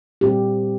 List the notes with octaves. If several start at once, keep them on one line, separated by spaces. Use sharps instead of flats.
A#2 G3 C4 G4